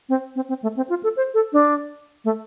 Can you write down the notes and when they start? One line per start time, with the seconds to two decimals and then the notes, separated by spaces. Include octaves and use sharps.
0.09 C4
0.36 C4
0.49 C4
0.63 A3
0.77 C4
0.90 F4
1.03 A4
1.17 C5
1.34 A4
1.53 D4
2.25 A3